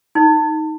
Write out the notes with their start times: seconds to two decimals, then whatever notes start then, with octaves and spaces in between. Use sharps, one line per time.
0.15 D#4